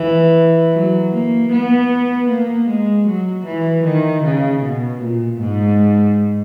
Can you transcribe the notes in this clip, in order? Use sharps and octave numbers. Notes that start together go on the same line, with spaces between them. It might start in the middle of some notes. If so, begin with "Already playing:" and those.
Already playing: E3
F#3
A#3
B3
A#3
G#3
F#3
E3
D#3
C#3
B2
A#2
G#2